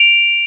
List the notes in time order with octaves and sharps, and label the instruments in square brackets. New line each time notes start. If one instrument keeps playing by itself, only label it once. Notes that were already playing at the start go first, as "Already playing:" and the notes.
Already playing: [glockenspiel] D7 F7